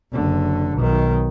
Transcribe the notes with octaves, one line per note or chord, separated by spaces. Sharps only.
F#1 D3
B1 D#3